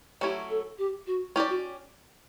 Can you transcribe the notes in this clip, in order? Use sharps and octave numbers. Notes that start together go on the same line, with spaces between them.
F#3 A3 C#4 E4 G4
A4
G4
F#4
C#4 E4 G4 D5
F#4